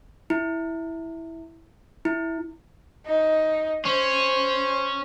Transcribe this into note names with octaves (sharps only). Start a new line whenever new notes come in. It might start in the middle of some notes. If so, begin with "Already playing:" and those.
E4
E4
D#4
C#4 C5